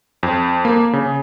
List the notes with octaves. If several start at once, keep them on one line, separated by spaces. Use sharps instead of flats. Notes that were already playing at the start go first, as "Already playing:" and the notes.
F2
A#3
C#3